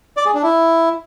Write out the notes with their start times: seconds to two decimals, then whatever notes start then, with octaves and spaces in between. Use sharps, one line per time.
0.17 D5
0.26 G#4
0.34 D4
0.43 E4